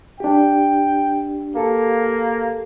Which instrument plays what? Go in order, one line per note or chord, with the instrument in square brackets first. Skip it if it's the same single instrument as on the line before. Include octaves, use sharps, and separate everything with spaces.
[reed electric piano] D4 G4 [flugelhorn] G5
[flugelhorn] A#3 [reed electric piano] G4 A4